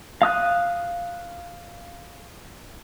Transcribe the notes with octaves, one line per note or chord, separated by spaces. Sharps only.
F5 D#6 F#6